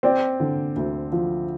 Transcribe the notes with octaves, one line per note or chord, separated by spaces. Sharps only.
C4 D5 G5
D3
D2
F3